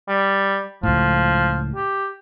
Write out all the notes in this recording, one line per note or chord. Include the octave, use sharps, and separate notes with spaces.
G3
C#2 A2 F3
G4